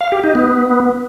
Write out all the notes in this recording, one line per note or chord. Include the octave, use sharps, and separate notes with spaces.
F5
G4
D#4
B3